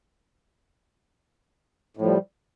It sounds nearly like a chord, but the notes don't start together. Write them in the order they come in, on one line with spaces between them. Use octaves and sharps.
A2 F3 G3